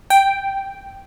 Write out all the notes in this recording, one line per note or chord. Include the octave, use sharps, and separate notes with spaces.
G5